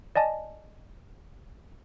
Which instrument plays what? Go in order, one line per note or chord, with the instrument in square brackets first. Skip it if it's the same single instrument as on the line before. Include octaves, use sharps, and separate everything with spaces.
[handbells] D5 D#5 G#5 A5